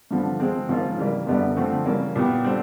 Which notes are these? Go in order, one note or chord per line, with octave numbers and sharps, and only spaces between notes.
G2 D3 F3
F3 G#3 C4
G#2 F3 A#3 C#4 F4
C#3 E3 G3 A#3
F#2 D3 G3 B3
D3 F3 A3 C4
C#3 E3 G3 A#3 C#4
A#2 F#3 B3 E4 G4
D3 G3 C4